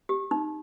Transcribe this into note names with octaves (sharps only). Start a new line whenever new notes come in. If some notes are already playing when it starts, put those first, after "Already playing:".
G4
D#4